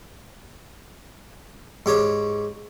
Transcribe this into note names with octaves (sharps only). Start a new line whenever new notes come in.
G#2 G4 C#5